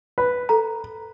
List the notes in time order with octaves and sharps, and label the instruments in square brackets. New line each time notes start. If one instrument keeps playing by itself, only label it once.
[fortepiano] B4
[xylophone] A4 A#5